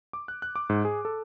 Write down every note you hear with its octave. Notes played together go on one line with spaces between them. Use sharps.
D6
F#6
F#6
D6
G#2
G#4
A4